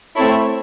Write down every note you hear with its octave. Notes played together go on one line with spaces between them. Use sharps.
A3 C4 E4 A4 C#5